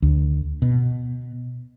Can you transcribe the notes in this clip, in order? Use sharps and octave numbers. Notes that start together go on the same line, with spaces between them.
D2
B2